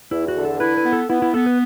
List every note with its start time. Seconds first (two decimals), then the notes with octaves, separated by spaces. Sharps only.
0.11 E2 E4
0.28 F#4
0.36 D3
0.45 A4
0.60 E4 B4
0.77 B4
0.85 B3
0.93 A4
1.09 B3 E4
1.22 E4
1.34 B3 A4
1.46 B4